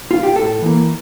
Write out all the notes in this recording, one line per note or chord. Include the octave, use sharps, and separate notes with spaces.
F4
G4
A2 A4
E3 A#3